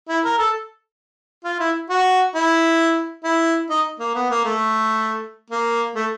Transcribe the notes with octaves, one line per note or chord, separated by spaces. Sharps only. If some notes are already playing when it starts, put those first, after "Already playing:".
E4
A#4
A4
F4
E4
F#4
E4
E4
D#4
A#3
B3
A#3
A3
A#3
A3